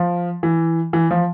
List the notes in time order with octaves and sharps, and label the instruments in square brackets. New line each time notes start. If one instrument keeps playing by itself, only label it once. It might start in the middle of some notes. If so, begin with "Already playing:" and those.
Already playing: [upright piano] F3
E3
E3
F3